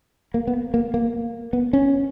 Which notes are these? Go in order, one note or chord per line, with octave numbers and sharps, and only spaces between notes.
A#3
B3
A#3
A#3
B3
C#4